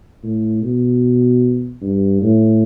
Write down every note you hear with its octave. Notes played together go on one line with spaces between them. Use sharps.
A2
B2
G2
A2